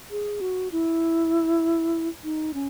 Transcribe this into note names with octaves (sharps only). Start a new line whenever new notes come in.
G#4
F#4
E4
D#4
C#4